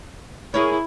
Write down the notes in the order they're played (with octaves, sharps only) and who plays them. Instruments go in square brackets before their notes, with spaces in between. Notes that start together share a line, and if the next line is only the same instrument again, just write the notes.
[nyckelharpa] E4 [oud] G#4 A#4 C#5